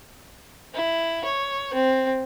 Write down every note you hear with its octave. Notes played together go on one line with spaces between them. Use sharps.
E4
C#5
C4